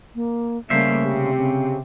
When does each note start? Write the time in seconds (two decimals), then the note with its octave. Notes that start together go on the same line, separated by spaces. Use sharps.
0.15 A#3
0.70 C#3 G3 A3 A#3 C5 E5
1.04 C3 G4
1.36 C#3